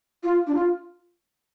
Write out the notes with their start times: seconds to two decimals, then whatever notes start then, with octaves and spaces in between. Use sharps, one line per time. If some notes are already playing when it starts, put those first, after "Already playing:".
0.23 F4
0.47 D4
0.55 F4